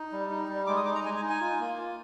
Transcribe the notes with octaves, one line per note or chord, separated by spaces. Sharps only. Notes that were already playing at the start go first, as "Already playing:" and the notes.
Already playing: D#4
G3
D#4
G3
G#3 D6
D#6
D#4 D6
A#5
G#3 G#5
G#5
D#4
G#5
F4
A#3
F4